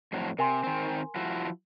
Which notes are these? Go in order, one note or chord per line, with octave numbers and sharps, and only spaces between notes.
F2 A2 F#3
C3 A#4 G#5 C6
D#3 C4
F3 E4 F#4